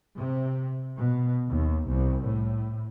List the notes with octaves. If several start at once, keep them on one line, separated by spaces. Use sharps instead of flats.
C3
B2
D#2
C2
A2